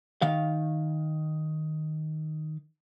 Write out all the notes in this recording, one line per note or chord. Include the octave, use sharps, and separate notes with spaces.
D#3 F5